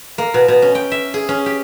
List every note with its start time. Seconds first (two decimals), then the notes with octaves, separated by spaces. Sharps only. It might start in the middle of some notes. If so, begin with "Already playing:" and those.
0.18 A#3
0.34 B2
0.48 B2
0.62 C#4
0.75 G5
0.92 E5
1.14 G#4
1.29 C#4
1.46 G4